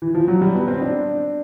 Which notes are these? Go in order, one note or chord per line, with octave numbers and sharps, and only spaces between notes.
E3
F3
F#3
G3
B3
C4
D4